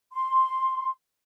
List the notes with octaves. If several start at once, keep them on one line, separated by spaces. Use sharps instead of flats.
C6